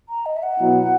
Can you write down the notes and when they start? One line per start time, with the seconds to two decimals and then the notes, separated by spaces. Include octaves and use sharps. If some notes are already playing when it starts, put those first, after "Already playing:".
0.09 A#5
0.26 D#5
0.36 E5
0.43 F#5
0.59 B2 F#3 B3 E4